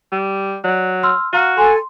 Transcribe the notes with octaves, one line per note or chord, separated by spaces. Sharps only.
G3
F#3 D5
C6 E6 F6
F#4 F5 A#5 F6
A4 G#5 C6